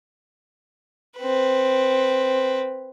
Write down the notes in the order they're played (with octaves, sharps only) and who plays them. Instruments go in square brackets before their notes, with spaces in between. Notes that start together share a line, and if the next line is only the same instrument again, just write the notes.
[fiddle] C4 B4